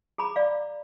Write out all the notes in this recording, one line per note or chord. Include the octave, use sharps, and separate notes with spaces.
G#4 A#5 B5 D6
D5 F5